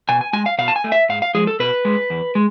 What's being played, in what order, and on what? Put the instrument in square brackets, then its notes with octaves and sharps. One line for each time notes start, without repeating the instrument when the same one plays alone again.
[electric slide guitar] B2 G#5
G#5
G#3 G#5
F5
B2 F5
A5
G#5
A3
E5
G#2 F5
F5
F3 G#3 G#4
A4
B2 B4
G#3
E2
G#3